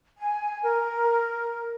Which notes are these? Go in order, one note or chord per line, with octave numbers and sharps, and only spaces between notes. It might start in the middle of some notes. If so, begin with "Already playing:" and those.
G#5
A#4